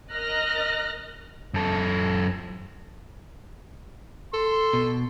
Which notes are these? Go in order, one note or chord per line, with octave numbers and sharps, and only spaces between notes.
A#4 D#5 F6 F#6 A#6
F#2 A4
A4 C6
B2